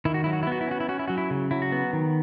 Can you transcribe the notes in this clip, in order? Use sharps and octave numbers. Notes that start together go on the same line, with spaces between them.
D#3 E4
F#4
F#3 E4
F#4
E4
B3 F#4
E4
C#4 F#4
E4
C#4 F#4
E4
F#3 F#4
E4
C#3
F#3 E4
F#4
B3
D#3